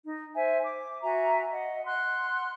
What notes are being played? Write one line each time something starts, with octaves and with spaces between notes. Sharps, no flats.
D#4
C5 E5 G#5
D6
F#4 E5 G#5 A#5
D#5 F#5
F#5 C6 F6 F#6